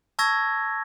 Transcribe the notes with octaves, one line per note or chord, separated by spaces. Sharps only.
A5 C#6 E6 G#6 A#6